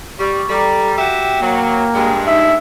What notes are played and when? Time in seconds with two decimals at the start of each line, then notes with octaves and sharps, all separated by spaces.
0.19 G3 C#6
0.49 G3 A4 A#5
0.98 F#4 G4 E5 G5
1.41 F#3 A#3
1.94 G2 G#3 G5
2.27 D#4 E5